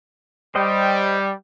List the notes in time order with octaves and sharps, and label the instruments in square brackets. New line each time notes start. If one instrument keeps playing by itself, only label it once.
[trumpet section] G3 [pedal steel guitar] C5 D#5 G5